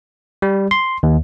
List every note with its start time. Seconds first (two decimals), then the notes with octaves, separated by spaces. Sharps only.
0.42 G3
0.71 C6
1.03 D#2